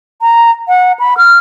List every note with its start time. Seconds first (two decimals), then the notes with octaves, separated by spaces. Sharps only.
0.21 A#5
0.68 F#5
0.99 B5
1.18 F6